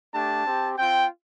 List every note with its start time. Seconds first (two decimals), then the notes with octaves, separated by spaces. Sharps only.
0.14 A3 D4 G4 A5
0.45 C4 G4
0.77 C4 F4 G5